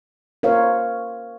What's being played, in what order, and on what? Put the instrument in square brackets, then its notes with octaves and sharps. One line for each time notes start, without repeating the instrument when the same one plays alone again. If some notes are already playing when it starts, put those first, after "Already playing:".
[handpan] A#4 C5 C#5 F5